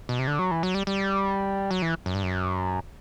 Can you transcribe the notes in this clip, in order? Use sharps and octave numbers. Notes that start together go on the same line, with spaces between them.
B2
C3
D3
F#3
E3
F#3
G3
G3
F#3
E3
F#2
G2
F#2